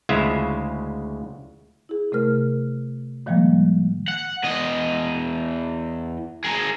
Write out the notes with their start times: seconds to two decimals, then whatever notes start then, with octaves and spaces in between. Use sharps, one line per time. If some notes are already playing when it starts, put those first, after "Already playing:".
0.09 D2 C#3 G#3 E4 F4 E5
1.89 E4 G#4
2.12 C3 A3 A#4 F6
3.26 A2 D#3 F3 G3 G#3 A#3
4.08 F#5
4.44 E2 D#5
6.44 G#4 A#4